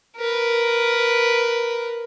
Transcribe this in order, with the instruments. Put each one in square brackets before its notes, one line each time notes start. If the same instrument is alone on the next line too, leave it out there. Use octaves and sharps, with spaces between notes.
[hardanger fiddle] A#4 B4